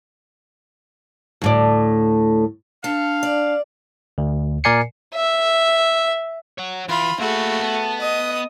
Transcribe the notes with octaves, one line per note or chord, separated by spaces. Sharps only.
D2 A2 D5
D4 A4 F5
D5
D2
A#2 A#4 D5 G#5 C7 C#7
E5
C#5 F#5
E3 F4 B5
A3 A#3 F#4 G#4 B5
B3 A5
D#5 D#6